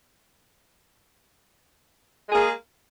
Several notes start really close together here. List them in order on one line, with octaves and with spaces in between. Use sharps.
G#3 G#4 A#3